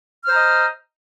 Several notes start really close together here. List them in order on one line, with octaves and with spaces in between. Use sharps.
F6 C5 A#5 D#5